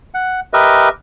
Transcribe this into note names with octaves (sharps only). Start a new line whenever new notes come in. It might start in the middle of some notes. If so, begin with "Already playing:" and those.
F#5
G4 A#4 B4 D#5 E5